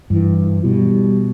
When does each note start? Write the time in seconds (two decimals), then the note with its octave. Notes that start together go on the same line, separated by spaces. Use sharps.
0.10 G2 E3
0.64 B2 G3